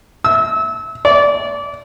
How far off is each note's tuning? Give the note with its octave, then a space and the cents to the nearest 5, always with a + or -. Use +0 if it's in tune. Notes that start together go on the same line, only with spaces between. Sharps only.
E6 -30
D5 -25